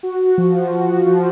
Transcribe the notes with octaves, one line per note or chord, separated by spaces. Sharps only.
F#4
F3
F#4
F3